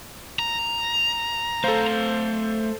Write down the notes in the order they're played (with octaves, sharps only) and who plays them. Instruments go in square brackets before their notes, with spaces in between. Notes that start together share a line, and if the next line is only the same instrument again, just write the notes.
[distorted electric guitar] A#5
[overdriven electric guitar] A3 F5 [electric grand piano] A4 C5